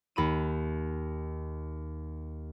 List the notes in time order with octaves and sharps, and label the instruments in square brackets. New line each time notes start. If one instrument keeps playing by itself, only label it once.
[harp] D#2 B5 D#7